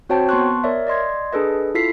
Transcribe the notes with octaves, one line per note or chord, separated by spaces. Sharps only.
C4 F#4 C5 C#5 G5 A5
B3 A5 C6 C#6 F#6
A#4 C#5 D5 E5
D5 D#5 C6 G#6
D4 G#4 A4 B4 D#5
E4 F4 A4 B6 C7